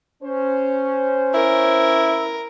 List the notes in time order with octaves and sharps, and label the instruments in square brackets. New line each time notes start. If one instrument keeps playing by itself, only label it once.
[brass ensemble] C#4 C5
[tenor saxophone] E4 [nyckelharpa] A#4